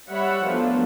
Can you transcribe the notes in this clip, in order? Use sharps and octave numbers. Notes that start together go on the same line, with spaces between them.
G3 C#5 E5 F#5 B5
F3 F#3 A3 B3 D4